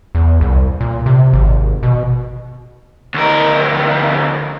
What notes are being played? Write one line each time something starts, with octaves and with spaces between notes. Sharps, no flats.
E2
C2
A#2
C3
G#1
B2
D2 A#4